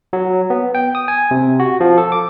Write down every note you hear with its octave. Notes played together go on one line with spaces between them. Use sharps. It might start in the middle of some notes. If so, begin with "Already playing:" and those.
F#3
B3
G5
D#6
G#5
C3
F#4
F3
A4
D6